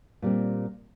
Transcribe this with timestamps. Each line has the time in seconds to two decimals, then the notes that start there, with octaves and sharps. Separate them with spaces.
0.22 A#2 G3 C4